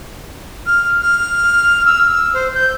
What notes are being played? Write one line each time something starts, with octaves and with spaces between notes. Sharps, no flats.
F6
F6
E6
C5
G6